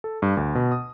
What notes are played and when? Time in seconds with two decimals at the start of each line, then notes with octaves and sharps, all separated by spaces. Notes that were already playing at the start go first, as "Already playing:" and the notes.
0.04 A4
0.22 G2
0.37 D2
0.55 B2
0.72 D#6